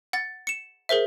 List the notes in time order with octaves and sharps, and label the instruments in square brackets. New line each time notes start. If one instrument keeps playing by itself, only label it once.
[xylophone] F#5 A6
C#7 E7
G#4 A#4 C5 E5